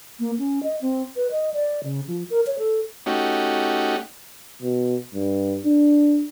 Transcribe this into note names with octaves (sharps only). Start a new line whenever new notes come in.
A#3
C#4
D#5
C4
B4
D#5
D5
C#3
F3
A#4
C#5
A4
A3 C#4 D#4 F#4 G4
B2
G2
D4